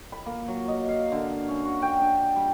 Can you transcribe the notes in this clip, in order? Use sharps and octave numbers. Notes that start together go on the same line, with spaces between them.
B5
A#3
F#3
D#5
F5
D3
F5
C#4
F#4
G5
D4
G3